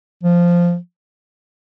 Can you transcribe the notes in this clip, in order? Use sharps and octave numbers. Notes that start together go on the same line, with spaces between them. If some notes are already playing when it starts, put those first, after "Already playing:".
F3